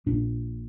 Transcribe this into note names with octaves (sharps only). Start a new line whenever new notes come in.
A#1 A#2 D4